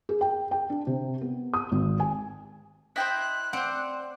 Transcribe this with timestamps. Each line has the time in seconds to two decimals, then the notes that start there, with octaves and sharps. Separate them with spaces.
0.09 G#4
0.21 G5
0.51 G5
0.70 D4
0.87 C3
1.21 B3
1.54 D#6
1.72 G#1
2.00 G#5
2.96 E4 C5 D#5 G5 F#6
3.53 C4 C5 D5 F#5